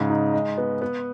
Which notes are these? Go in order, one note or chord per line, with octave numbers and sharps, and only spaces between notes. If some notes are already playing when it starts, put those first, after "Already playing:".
Already playing: G#2 C#3
D#4
G#3
B3
B3